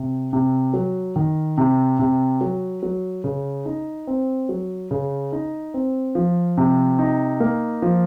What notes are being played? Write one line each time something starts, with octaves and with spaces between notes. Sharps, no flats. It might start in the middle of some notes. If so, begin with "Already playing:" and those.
Already playing: C3
C3
F#3
D#3
C3
C3
F#3
F#3
C#3
D#4
C4
F#3
C#3
D#4
C4
F3
C3
D#4
A#3
F3